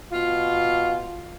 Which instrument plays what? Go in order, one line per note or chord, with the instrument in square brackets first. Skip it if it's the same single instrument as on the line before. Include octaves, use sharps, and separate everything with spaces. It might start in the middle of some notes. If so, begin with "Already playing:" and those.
[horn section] B2 F4